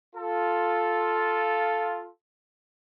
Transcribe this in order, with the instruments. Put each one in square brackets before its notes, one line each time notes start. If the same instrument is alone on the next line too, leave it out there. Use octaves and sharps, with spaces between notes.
[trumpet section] F4 A4